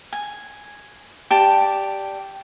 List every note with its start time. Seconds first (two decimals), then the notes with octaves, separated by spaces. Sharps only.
0.13 G#5
1.31 G4 D5 A5